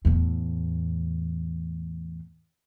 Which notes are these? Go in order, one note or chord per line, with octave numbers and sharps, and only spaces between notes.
E2 A2